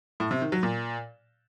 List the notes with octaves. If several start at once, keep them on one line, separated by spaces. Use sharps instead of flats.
A2
C3
D#3
F#3
A#2